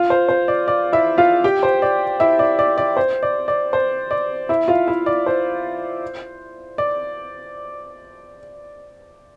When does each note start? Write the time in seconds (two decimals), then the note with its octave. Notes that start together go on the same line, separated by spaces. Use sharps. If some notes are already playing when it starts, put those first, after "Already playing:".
Already playing: F4 F5
0.10 C5
0.29 C5
0.48 D5
0.68 D5
0.93 E4 E5
1.18 F4 F5
1.44 G4 G5
1.63 C5
1.82 D5
2.20 E4 E5
2.39 D5
2.59 D5
2.78 D5
2.97 C5
3.23 D5
3.48 D5
3.73 C5
4.11 D5
4.49 E4 E5
4.68 F4 F5
4.87 E4 E5
5.06 D5
5.26 C5
6.78 D5